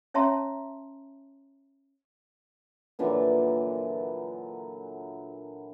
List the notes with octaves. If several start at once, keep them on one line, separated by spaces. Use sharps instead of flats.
C#4 C#5 E5 A5 A#5 C6
A#2 D3 E3 F#3